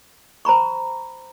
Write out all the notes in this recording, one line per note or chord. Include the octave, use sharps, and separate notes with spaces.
C5 A#5 B5 C#6